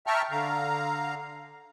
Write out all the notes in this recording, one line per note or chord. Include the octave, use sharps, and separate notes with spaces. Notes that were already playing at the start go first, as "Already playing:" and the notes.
E5 G5 A5 A#5 C#6 F6
D3 F5 A#5